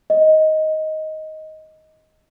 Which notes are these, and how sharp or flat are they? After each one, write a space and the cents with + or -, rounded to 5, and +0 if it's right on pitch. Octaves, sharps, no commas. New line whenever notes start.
D#5 +10